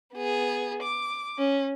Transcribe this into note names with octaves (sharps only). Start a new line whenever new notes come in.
B3 G#4
D6
C#4